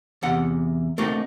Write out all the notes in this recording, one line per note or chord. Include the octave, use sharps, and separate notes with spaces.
E2 C3 F#5
A3 A#3 C4 D4 D#4 F#4